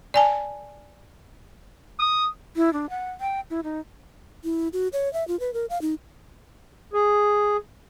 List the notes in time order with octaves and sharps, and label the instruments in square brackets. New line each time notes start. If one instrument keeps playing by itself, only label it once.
[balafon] D5 G#5 A5
[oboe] D#6
[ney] E4
D4
F#5
G5
E4
D#4
[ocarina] E4
F#4
C#5
E5
F4
B4
A#4
F5
D#4
[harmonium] G#4